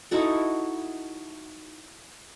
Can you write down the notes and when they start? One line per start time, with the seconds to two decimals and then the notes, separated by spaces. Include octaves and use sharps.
0.11 D#4 E4 F#4 A4